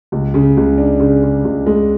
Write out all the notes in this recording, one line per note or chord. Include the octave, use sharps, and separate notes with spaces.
C#2
C#3
C#2
D4
C#3
C#3
C#2
G#3